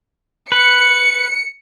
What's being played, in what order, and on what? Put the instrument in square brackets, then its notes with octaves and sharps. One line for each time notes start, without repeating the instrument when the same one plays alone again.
[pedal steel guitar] B4 [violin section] C#7